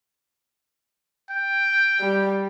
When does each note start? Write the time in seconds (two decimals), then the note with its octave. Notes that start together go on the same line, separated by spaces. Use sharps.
1.30 G5
2.01 G3